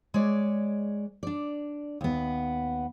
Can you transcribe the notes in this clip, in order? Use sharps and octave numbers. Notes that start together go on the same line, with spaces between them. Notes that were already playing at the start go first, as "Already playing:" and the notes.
G#3 C#5 D5
D4 D5
D#2 B3